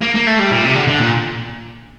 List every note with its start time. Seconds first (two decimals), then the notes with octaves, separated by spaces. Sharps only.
0.02 A#3
0.15 A#3
0.27 A3
0.39 G3
0.51 A#2
0.64 C3
0.75 D3
0.88 D3
1.00 A#2